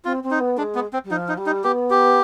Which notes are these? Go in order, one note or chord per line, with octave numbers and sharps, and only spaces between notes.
C4 F4
C4
D#4
B3
G#3 D4
B3
C4
G3
F3 D#4
D#4
G3
D#4
B3 G4
G4